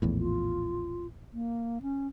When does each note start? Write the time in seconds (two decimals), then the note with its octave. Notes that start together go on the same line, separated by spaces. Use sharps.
0.02 A#1 E2 A2
0.18 F4
1.33 A#3
1.82 C#4